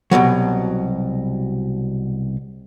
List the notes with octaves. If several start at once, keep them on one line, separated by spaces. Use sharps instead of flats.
C2 G#2 B2 F#3